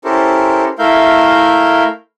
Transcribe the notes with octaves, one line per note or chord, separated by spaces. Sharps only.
C#4 E4 G4 A4 A#4 C5
A3 E4 A#4 E5 F5 G6